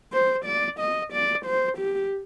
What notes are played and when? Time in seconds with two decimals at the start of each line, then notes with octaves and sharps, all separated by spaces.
0.13 C5
0.45 D5
0.80 D#5
1.13 D5
1.46 C5
1.78 G4